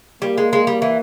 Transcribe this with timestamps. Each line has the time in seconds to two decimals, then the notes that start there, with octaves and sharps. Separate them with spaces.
0.22 G3 A#3
0.38 G#3
0.53 G#3
0.67 G3
0.82 E3